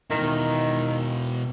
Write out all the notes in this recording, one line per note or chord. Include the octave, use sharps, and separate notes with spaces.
B2 D#3 E4